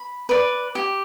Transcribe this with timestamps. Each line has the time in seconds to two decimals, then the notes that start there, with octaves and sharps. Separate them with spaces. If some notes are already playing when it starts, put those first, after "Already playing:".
Already playing: B5
0.29 B4 D5
0.75 G4